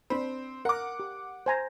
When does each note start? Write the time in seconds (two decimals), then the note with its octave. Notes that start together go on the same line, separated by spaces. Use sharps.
0.10 C4 D4 B5
0.65 A#4 F#5 D6
1.00 G4
1.46 C5 G#5 A#5